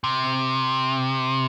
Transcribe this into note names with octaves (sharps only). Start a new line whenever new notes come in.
C3